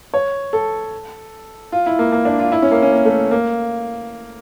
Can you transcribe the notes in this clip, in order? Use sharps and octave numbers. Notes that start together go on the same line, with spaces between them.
C#5
A4
F4
E4
A#3
A#3
D4
F4
E4
C#4
A#3
C#4
A#3
A3
A#3